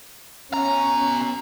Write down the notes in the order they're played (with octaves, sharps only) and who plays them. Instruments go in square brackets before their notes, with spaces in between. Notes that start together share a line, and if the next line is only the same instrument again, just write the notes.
[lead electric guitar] B2 A#5 [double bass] C#4